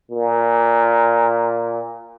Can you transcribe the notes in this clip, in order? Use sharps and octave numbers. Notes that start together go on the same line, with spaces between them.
A#2